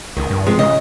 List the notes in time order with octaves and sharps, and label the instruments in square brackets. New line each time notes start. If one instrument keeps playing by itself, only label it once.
[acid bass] C#2 [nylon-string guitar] D#3
[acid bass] G2
[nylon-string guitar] C3 F3 G#3
[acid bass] C#3 [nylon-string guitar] D#5